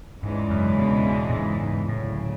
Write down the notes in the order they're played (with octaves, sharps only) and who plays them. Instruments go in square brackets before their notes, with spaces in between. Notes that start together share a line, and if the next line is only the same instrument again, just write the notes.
[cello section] E2 C#3 E3 G#3 D4 [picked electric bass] G#2
[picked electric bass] F#2
B2
B2
A2
G#2
G#2
[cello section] D2 C#3 F#3 [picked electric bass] A2